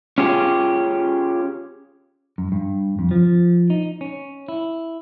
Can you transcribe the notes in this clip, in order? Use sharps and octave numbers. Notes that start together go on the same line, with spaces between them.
C#4 F4 G4 G#4
F#2
G2
F2
F3
D#4
C#4
E4